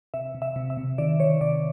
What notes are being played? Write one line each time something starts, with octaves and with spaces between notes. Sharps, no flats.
C3 E5
C3
E5
C3
E5
C3
D#3 D5
D#3 C#5
C3 D5